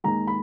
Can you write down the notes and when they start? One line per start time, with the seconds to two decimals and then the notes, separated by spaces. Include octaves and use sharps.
0.04 D#2 D#3 G#3 A#5
0.27 B5